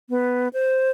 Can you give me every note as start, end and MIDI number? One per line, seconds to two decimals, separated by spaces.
0.09 0.48 59
0.53 0.91 72